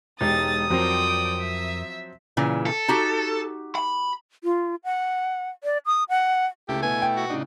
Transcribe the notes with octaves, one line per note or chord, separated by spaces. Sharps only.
E1 G#3 D#4 G4 D#6 A6
F2 F3 F#3 C4 A#4 D5 G5
E5
A#2 C#3 E3
A4
D#4 F#4 G4
B5
F4
F#5
D5
D#6
F#5
C#2 A3 E4 G4
B2 B3 G#5
G5
F#4
A2 C#3 D4 D#4